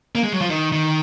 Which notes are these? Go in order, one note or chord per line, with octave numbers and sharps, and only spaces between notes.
A#3
G#3
F#3
F3
D#3
D#3